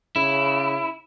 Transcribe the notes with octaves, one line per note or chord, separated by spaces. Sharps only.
C#3 E4